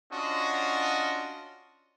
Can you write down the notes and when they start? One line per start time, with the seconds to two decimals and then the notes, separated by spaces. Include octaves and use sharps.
0.12 C#4 D4 F4 F#4 D#5 C6